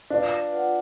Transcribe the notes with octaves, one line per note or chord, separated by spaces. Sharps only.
D4 F4 B4 F5
F4 B4 D5 F#5